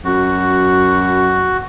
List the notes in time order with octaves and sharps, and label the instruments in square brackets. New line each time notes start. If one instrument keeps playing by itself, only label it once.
[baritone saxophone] F#2 [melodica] F#4